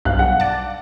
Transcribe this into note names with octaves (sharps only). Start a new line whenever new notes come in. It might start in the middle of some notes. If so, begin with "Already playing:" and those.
B1 G2 F5 F#6
F#5
D5 A5